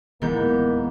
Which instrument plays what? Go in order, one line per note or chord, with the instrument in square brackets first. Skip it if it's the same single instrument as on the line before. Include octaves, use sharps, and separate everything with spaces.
[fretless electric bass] D1 E3 [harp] G#2 B3 G6 [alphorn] A#3